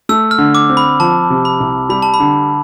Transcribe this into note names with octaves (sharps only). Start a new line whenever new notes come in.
A3 E6
F6
D3
D6
C4
B5
F3 A5
C3
B5
C2
G3 B5
A5
B5
D3